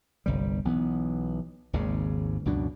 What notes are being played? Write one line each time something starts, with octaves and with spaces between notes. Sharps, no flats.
G1 C2 G3
B1 E3 B3
G#1 D#2 G#2 C#3
C#2 F#2 B2 D4